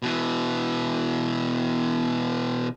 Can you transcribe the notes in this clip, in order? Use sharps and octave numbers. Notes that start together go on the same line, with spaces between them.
B2 E3